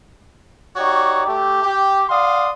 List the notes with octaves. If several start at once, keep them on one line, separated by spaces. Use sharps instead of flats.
D#4 F#4 G4 C#5 D5
A3 G4
G4
D5 F5 F#5 C6 D#6